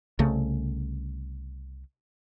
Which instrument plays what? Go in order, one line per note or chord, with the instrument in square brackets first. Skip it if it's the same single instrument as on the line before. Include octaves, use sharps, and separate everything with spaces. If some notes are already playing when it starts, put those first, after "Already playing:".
[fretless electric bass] C2 C#3 A3